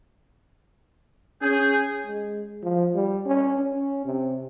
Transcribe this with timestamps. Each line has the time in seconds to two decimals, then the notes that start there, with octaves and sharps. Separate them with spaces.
1.42 C#4 G#4 G6
2.06 G#3
2.63 F3
2.95 G3
3.25 C#4
3.56 C#4
4.05 C3